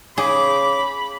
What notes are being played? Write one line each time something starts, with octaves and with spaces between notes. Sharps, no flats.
C#3 G#4 B5 D6